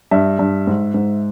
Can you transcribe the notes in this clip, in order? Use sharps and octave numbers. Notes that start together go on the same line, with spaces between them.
G2 E5
G2
G#2
G#2